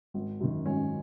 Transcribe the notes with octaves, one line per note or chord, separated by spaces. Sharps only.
G#1
F#2 D#3
G#1 C#4